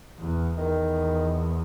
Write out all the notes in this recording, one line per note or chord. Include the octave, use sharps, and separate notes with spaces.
E2
E2 D#3